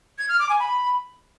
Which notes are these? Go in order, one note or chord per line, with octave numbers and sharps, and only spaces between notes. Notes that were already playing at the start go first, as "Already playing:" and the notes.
G#6
F6
D6
G#5
B5